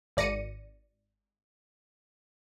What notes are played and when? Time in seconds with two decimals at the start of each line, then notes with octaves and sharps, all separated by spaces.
0.17 G#1 D5 A#6 C#7 D#7